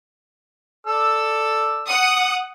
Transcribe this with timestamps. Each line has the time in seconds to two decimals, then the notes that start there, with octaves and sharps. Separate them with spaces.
0.87 A4 D5 E6
1.89 F#5 D#6